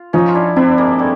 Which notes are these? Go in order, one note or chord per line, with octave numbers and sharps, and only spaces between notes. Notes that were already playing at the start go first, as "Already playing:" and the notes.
Already playing: F4
F3 C#4 D#4
F4
D4 E4
C4 D4 E4
G#3 A#3
G3 A3